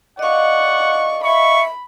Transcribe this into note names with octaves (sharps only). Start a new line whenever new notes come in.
D5 D#5 F5 F#5 C#6
E5 B5 C#6